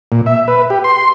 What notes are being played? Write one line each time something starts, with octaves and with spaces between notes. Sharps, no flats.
A#2
E5
B4
G4
C6